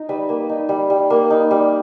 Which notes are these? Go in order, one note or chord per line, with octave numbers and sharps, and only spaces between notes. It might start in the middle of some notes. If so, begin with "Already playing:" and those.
Already playing: D#4
G3 B4
A#3
D#4
G3
G3
A#3
D#4
G3